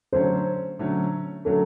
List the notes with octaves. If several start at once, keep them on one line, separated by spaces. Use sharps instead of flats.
D3 F#3 A3 C#4 C5
D3 F#3 A3 C#4
D3 F#3 A3 C#4 A4